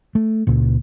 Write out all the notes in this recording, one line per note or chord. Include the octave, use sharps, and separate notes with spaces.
A3
C#2 A#2